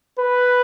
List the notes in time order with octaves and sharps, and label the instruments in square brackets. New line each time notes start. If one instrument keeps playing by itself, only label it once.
[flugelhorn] B4